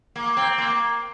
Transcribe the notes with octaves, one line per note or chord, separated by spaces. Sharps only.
A#3
C4
A#3